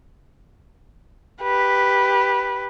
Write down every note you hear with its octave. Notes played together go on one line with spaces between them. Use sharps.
G4 B4